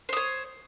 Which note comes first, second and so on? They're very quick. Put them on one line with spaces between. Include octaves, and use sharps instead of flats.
C5 D#6 C#5